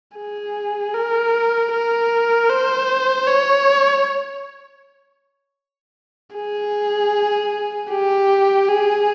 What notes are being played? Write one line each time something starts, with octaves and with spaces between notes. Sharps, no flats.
G#4
A#4
A#4
C5
C#5
G#4
G4
G#4